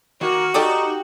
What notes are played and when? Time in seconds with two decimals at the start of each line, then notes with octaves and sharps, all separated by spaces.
0.21 D#3 A#3 F#4
0.54 D#4 G4 A4 D5 D#6